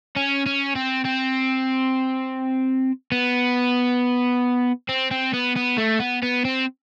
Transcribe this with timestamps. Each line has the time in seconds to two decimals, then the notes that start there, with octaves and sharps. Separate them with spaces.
0.16 C#4
0.46 C#4
0.75 C4
1.05 C4
3.12 B3
4.89 C4
5.11 C4
5.34 B3
5.56 B3
5.78 A3
6.00 B3
6.22 B3
6.45 C4